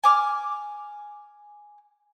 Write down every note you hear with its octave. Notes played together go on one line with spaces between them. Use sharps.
G#5 D6 F6